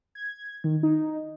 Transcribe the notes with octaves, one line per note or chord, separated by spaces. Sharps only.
G#6
D#3
D#4